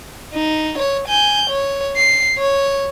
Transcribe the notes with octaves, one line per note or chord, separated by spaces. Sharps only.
D#4
C#5
G#5 G6
C#5
C7
C#5